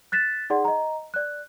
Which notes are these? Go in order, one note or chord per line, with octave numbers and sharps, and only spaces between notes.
F#6 A6 B6 E7
D#4 G#4 D5 F#5 C6
D#5 A#5
D5 F#6